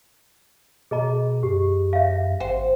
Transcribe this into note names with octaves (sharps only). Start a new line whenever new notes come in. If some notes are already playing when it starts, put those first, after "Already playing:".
B2 G#4 D#5 A#5
F#2 G4
E5 F5
G#1 C5 F#5 G5